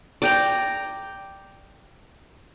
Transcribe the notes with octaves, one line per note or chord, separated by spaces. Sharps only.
D5 G5 A#5